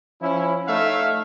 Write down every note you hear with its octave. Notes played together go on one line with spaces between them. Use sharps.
F3 C#4 E4
A3 D#4 C#5 E5 F5